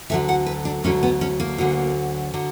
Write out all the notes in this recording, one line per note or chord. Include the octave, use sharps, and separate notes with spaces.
D2 D3 F#3 E5
F#5
B4
D4
D2 D3 F#3 C#4
B3
C#4
A#3
D2 D3 F#3
D3 F#3